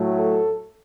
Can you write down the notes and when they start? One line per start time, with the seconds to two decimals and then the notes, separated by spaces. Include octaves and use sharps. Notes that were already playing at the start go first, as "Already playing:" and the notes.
Already playing: A2 F#3 A3
0.16 A4